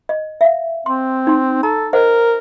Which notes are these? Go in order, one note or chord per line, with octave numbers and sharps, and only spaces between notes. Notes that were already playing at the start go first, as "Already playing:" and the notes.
D#5
E5 F5
C4 C6
D#4 C6
A4 A#5
A#4 C5 D#5 F#5